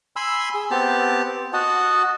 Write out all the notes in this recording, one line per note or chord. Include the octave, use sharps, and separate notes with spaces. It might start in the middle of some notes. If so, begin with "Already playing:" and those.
G#5 B5 C6 E6
G#4
B3 C4 G4 A5
F#4 D#5 F#5 A5